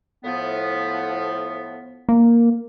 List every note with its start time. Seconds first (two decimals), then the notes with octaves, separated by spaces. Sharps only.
0.24 A2 F3 B3
2.09 A#3